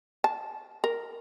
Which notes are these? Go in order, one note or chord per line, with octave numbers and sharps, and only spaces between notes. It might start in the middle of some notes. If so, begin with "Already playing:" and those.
A5
A#4